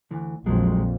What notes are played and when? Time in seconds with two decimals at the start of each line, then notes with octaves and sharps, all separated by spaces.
0.11 D2 E3
0.46 A#1 F2 A#2 F3 F#3 G#3